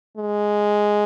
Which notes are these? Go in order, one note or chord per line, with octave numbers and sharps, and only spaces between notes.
G#3